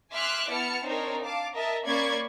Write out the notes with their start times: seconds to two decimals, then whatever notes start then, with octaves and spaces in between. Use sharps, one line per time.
0.13 E5 G#5 C6 D6 F6 F#6
0.49 B3 E4 A5 F6 C#7
0.85 C4 D4 D#4 A#4 C5 C#5
1.23 F5 A5 D6
1.55 A#4 D#5 E5 A5
1.85 A#3 C#4 D5 B5 C#6 G#6